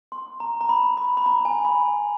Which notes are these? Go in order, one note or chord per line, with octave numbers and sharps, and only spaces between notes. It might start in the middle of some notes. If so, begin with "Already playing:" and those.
C6
A#5
A#5
B5
B5
B5
A#5
G#5
B5